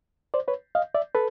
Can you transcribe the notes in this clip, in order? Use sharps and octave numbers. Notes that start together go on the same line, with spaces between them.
C5 D5
B4 C#5
D#5 F5
D5 E5
A4 B4